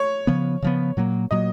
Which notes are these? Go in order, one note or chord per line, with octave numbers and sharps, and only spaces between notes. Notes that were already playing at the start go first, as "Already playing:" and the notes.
Already playing: C#5
C#3 F3 B3
C#3 F3 B3
A#2 F#3 A#3
A#2 F#3 A#3 D#5